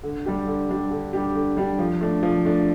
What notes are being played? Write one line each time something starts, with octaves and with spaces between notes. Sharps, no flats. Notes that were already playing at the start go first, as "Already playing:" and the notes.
D3
G3 D4 G4
D3
G3 D4 G4
D3
G3 D4 G4
D3
G3 D4 G4
F3
A3 D4
F3
A3 D4